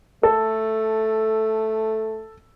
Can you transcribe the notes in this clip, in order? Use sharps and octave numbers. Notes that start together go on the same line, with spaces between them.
A3 A4